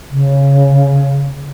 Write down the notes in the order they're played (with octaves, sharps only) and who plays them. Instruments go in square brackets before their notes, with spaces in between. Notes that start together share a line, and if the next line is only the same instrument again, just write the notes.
[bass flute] C#3